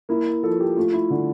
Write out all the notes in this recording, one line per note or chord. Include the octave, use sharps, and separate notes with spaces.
A#3 E4
F3 A4
G4
A3 F4
E4
D3